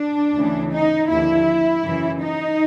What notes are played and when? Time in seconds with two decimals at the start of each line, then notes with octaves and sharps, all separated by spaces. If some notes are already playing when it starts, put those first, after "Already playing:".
Already playing: D4
0.36 D2 C#3 E3
0.73 D#4
1.10 D#2 D3 F3 E4
1.84 F#2 C#3 E3
2.20 D#4